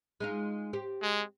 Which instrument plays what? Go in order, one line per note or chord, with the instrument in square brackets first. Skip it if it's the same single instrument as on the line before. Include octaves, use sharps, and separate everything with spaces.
[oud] G#3 D#4 F4
C4 G4
[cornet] G#3